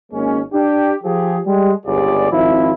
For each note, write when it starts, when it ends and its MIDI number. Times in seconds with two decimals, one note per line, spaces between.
0.12 0.40 32
0.12 0.40 56
0.12 0.40 58
0.12 0.40 61
0.53 0.93 62
0.53 0.93 67
1.04 1.39 53
1.04 1.39 67
1.04 1.39 68
1.45 1.73 55
1.45 1.73 56
1.86 2.29 31
1.86 2.29 37
1.86 2.29 67
1.86 2.29 68
1.86 2.29 74
2.31 2.72 32
2.31 2.72 53
2.31 2.72 60
2.31 2.72 64